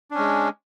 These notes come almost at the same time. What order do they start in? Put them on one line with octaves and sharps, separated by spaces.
D4 C#4 G#3